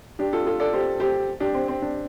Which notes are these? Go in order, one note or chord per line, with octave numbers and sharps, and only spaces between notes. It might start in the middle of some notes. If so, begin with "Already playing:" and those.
D4 G4
F4 A4
F4 A4
A4 D5
G4 C5
G4 C5
D4 G4
C4
C4
D4